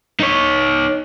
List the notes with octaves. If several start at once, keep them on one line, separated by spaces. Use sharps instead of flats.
D#4 C#5